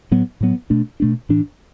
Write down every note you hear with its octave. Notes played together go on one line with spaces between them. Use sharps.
A2 F#3 B3
A2 F#3 B3
B2 A3 D4
B2 A3 D4
A2 E3 D4